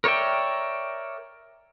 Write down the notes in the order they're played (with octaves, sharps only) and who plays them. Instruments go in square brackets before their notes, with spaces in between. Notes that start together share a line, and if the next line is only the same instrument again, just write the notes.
[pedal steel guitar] A#4 C#5 D5 E5 G5